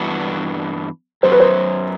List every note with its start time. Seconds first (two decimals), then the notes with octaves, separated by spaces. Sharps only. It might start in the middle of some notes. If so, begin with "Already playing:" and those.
Already playing: G2 E3 B3 D4 F#4
1.23 F#2 F#3 B3 C5
1.32 B4
1.40 C5